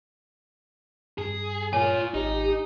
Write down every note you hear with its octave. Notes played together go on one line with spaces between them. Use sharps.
G2 G#4
A#2 F4 C#5 G#5
G#1 D#4 G4